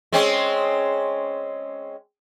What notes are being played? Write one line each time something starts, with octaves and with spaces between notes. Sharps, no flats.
G#3 C4 C#4